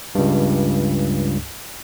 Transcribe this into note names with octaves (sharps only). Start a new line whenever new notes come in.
C#2 G2